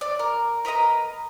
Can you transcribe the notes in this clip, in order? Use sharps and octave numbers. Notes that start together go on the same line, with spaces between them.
D5
A#4
A#4 B4 D#5 A#5